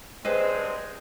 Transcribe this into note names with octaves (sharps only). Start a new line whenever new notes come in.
G2 G#3 C4 G#4 B4 C5 D#5